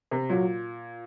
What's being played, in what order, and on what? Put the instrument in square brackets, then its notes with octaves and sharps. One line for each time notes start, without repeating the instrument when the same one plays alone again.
[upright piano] C3
[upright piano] A#2 [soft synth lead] F#3